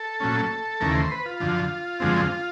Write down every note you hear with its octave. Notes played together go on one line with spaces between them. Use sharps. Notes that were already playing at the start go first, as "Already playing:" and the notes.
Already playing: A4
A#2 F#3 A3 C#4
D#2 C#3 E3 A3 A#4
C5
B4
F4
F#2 D3 F3
F#2 D3 F3 G#3 C4